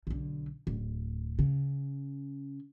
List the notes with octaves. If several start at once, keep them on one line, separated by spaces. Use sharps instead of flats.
B1 D3
D1
C#3